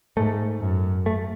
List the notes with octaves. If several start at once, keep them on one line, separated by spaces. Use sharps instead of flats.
G#2 A3
F#2
A3